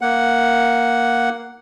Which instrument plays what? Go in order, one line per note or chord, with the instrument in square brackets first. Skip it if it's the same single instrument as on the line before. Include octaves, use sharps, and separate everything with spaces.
[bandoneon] A#3 F#5